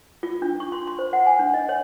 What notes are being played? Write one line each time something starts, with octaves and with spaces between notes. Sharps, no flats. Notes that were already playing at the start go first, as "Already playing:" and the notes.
F4
D4
C#6
C6
C6
C5
F#5
G#5
D4
D#5
C#5